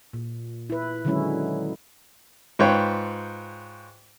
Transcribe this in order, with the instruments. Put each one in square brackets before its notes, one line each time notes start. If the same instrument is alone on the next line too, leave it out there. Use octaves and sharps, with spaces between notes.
[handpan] A#2
E4 B4
D3 D#3 F#3 G#3 C#4 E4
[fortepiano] G#2 F4 B4 C#5 G5